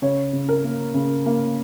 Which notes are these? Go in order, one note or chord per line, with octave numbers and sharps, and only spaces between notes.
C#3 C#5
C#3
A#4
A#3
C#3
A#3